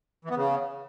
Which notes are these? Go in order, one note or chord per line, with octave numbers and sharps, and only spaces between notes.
E3
B3
C#3